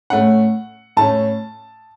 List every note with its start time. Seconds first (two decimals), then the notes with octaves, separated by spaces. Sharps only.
0.10 A2 A3 C#4 F#5
0.97 A2 A3 C#4 A5